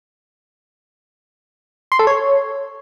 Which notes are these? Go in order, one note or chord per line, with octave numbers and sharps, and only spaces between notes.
C6
A4
C#5